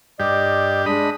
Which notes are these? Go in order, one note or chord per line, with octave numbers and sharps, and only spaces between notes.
G2 G4 D5 D#5
G#3 D4 D#5 B5